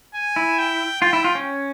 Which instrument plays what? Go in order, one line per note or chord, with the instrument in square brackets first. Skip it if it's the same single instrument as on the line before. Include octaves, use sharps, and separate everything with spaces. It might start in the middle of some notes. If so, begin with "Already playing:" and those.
[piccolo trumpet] G#5
[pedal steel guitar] E4
[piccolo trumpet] G5
[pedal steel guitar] F4 [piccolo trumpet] G5
[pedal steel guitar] E4
F4
C#4